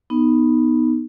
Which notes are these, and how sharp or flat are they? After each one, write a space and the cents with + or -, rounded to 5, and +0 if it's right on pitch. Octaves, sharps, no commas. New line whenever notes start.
B3 +0 D#4 -5